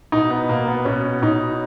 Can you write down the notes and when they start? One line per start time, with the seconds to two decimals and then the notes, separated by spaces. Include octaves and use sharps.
0.12 B2 D#4
0.30 B3
0.49 B2 A#3
0.68 B3
0.85 B2 C#4
1.22 B2 D#4